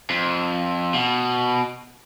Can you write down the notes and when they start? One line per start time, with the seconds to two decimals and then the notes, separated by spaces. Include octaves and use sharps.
0.10 F2
0.94 B2